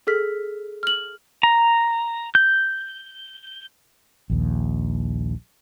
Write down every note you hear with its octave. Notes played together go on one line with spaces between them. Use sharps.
G#4 A4 F6 B6
F6 F#7
A#5
G6
A#1 D#2